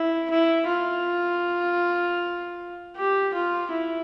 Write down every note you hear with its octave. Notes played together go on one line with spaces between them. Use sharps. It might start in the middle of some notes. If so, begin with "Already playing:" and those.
Already playing: E4
E4
F4
G4
F4
E4